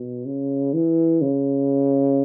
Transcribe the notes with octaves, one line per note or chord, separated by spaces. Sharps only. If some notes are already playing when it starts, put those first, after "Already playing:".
Already playing: B2
C#3
E3
C#3